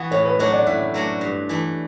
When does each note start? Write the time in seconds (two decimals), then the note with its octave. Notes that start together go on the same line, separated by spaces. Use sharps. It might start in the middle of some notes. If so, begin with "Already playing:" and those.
Already playing: E3 B3 F#4
0.11 A2 C#5
0.25 B4
0.39 F#3 A3 D4 F#4 C#5
0.53 D5
0.67 A2 E5
0.94 F#3 A3 D4 F#4
1.21 G2
1.49 E3 A3